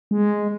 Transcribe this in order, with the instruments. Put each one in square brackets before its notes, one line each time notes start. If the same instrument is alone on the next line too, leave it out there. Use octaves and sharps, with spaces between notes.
[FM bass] G#3